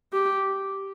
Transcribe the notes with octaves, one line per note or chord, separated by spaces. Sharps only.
G4